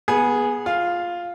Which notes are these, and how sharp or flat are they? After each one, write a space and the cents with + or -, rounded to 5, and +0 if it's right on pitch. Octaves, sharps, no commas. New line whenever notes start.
B3 -15 G#4 +0
F4 +5 F5 -10